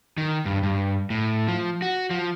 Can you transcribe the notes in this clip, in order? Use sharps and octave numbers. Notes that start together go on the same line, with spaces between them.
D#3
G2
G2
A2
F3
F#4
F3